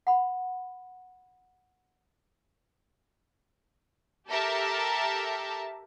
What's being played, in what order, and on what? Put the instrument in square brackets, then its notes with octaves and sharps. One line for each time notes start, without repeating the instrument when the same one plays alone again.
[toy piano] F#5 B5
[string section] G4 A4 A#4 E5 A5